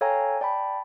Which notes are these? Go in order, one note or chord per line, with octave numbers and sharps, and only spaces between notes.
A4 C#5 F5 G5 G#5 A#5
D5 G5 A5 B5